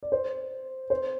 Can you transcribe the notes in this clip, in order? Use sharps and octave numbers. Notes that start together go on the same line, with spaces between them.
D5
C5
C5